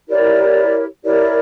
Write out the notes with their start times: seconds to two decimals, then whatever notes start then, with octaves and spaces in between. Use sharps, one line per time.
0.08 E4 G4 A#4 C#5 D5
1.03 E4 G4 A#4 C#5 D5